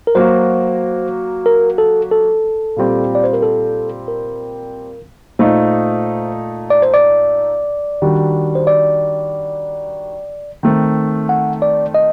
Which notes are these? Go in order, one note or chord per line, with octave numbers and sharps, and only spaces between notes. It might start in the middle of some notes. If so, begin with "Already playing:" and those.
A#4
F#3 A#3 F#4 C5
A#4
A4
A4
A#2 G3 C4 G4
D5
C5
A#4
A4
A#4
A#2 A3 D#4 C5
D5
C5
D5
D#3 G3 D4 F#4
C5
D5
D#3 A3 C4
F#5
D5
D#5